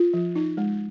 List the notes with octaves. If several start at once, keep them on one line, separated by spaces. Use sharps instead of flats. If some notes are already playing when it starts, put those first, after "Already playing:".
Already playing: F4
F3
D#4
G#3